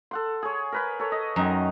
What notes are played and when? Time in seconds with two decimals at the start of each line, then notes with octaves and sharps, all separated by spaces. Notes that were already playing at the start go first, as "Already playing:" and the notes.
0.11 A4 F#5 C6
0.43 G#4 C#5
0.72 A#4 B4 B5
0.99 A4 C#5
1.12 D#5
1.36 F#2 D#3 D#5 A#5